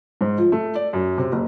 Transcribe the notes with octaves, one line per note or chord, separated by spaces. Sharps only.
G#2
F3
A3
D5
F#2
C3
F#1